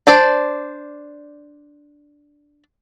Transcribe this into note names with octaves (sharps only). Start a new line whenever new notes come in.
D4 C5 D5